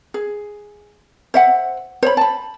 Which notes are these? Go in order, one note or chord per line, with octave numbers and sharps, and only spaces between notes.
G#4
C5 E5 F#5
C5 C#5 B5
A5 B5